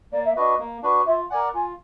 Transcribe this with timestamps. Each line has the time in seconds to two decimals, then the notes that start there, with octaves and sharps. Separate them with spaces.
0.12 A#3 D5
0.25 E5
0.36 D4 F#4 B4 D#5
0.59 A#3
0.82 D4 F#4 B4
1.06 F4 E5
1.30 A#4 D5 F#5 G#5
1.54 F4 G#5